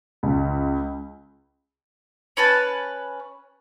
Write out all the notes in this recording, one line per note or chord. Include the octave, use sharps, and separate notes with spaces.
C#2
C#4 B4 A5